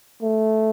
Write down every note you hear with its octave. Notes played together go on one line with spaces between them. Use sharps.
A3